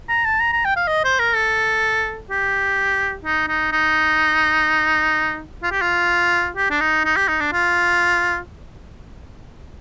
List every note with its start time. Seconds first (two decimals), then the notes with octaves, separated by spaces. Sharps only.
0.09 A#5
0.25 A5
0.40 A#5
0.53 A#5
0.65 G5
0.76 F5
0.87 D#5
1.04 C5
1.19 A#4
1.35 A4
2.30 G4
3.24 D#4
3.48 D#4
3.72 D#4
5.63 F4
5.71 G4
5.82 F4
6.56 G4
6.70 D4
6.80 D#4
7.05 D#4
7.16 G4
7.28 D#4
7.40 D4
7.53 F4